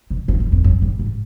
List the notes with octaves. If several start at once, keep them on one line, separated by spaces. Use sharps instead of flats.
B2
A#2
E2
F2
F#2
G2
G#2